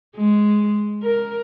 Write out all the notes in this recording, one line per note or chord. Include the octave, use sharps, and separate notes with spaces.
G#3
A#4